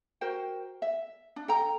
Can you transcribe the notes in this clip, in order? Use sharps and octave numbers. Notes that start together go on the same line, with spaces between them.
F#4 A#4 C5 G5
E5
D4
A4 G5 A#5